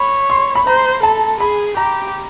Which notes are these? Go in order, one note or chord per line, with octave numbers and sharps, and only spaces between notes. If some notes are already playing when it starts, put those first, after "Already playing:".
Already playing: C#5 B5
C6
B5
C5 A#5
A4 A5
G#4 B5
G4 A#5